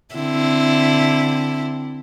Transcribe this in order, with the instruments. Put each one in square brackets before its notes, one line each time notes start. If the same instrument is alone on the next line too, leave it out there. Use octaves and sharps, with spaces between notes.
[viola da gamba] D3 C4 E4